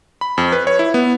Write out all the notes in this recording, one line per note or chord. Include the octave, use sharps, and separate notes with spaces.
B5
F2
B4
C#5
E4
B3